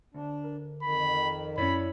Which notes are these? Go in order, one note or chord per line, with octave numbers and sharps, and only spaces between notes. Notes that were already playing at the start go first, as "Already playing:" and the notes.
D2 D4
A#4
F2 D#3 B5
F#2 F#3 C#4 E4 C#5 D5 B5